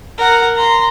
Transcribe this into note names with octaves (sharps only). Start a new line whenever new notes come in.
A#4 F#5
A#5 C6